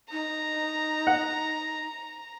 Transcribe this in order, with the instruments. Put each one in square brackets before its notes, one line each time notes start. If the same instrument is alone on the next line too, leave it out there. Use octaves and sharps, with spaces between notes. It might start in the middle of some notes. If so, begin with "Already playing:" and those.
[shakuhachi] D#4 [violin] A#5
[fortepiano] F#5